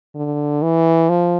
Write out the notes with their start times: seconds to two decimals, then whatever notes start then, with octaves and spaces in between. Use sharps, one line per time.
0.15 D3
0.62 E3
1.09 F3